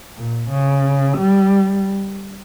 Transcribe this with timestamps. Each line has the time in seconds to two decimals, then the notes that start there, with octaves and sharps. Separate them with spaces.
0.17 A#2
0.51 C#3
1.18 G3